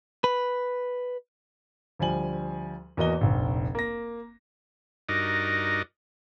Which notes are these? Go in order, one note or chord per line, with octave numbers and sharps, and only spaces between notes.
B4
D2 F3 G3 G#5 F#7
E2 A#3 F#4 D#5 G7
F1 A#1
A#3 A#6
G2 D#4 F#4 A#4 D5 D#5